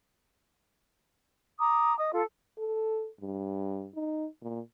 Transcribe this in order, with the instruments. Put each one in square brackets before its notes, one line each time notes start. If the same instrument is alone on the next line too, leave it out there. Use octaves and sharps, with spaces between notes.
[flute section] A#5 D6 D#6
D#5 D#6
F4 A4
[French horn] A4
G2
D#4
A#2